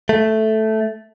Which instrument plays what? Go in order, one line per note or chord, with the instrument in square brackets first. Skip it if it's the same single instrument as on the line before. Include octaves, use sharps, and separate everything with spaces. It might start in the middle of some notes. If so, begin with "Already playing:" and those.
[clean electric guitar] A3